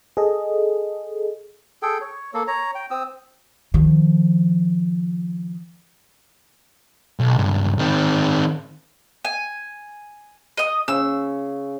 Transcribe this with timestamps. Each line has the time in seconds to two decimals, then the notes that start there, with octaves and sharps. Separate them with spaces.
0.17 G#4 A4 D#5
1.82 G#4 A4 G5
2.01 C#5
2.34 A#3 A4
2.47 C#5 A#5
2.75 G5
2.91 C4 D#6 E6
3.74 D#3 F3
7.19 B1
7.38 C#2 G2
7.79 D#3 C4
9.25 G#5
10.57 D#5 D#6
10.88 C#3 E6